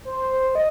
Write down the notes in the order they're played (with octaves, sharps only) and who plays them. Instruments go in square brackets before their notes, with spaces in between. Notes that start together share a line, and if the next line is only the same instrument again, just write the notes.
[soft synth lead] C5
D#5